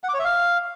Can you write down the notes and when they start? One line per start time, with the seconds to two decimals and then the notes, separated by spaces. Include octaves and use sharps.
0.04 F#5
0.09 D6
0.14 C#5
0.19 E5
0.25 F5